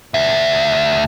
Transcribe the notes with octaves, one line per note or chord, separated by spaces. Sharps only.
D2 E5